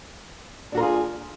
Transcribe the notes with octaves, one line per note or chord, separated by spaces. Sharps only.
D4 F4 F#4 G#4 A#4